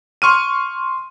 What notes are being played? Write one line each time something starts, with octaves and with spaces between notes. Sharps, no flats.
C6 C#6 F6 D#7